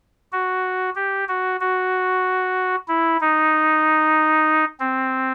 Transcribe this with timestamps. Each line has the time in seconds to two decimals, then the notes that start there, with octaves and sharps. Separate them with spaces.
0.32 F#4
0.95 G4
1.28 F#4
1.60 F#4
2.88 E4
3.21 D#4
4.80 C4